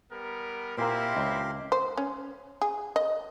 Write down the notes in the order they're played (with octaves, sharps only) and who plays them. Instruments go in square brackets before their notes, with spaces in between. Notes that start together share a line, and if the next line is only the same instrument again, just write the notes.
[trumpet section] G3 B3 A#4
[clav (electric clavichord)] A#2 A#3 [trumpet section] C4 E4 [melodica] G4 A#4 C6
[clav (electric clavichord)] C#2
[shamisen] C5
C#4
G#4
D#5